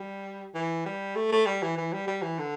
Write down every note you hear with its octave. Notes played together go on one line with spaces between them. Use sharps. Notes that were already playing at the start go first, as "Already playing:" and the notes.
Already playing: G3
E3
G3
A3
A3
G3
E3
E3
G3
G3
E3
D3